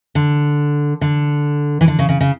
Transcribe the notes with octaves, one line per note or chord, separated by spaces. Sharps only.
D3
D3
E3
D3
C#3
C#3
C#3